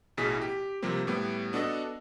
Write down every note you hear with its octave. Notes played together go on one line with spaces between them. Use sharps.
A1 B2 E3 G#4 B6
G4
C3 F3 G3 A#3 C4
A2 G3 B3
B3 D4 F#4 A4 D#5